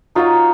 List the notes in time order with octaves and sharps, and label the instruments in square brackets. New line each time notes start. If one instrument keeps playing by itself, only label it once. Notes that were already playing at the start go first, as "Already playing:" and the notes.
[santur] D#4 F#4 C#5 F5 [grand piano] F4